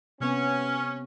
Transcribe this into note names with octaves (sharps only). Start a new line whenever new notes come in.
C3 B3 C#4